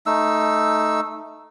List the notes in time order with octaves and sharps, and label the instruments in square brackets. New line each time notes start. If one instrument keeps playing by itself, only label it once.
[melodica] A3 D#4 E6